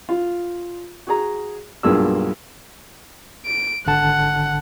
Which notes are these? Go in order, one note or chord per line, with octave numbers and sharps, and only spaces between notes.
F4
F#4 G#4 A#5
B1 G2 A#3 F4 G#4 E6
D7
G#1 D3 F#5 A5